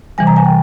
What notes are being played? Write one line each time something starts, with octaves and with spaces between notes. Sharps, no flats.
C3 E3 G3 G#5
A#5
G#5
G5